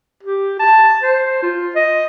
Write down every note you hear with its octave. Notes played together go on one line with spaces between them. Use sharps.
G4
A5
C5
F4
D#5